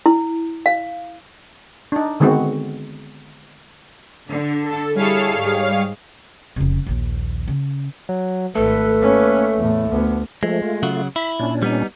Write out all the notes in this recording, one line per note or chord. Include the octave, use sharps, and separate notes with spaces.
E4
F5
D4 D#4
D3 D#3 G#3 B3 C4 F#4
D3
A4
G3 E4 G#4 A4 C#5 F5
G#2 G#4
F1 C#3
A#1 D#2
C#3
F#3
G#1 A3 A4 B4
A#3 C#4
E2 A2
D2 B3
F3 G#3 A3
A3 F4
C#3 F#3 F#4
E4 B5
A#2 C#4 D4
G3 B3 D#4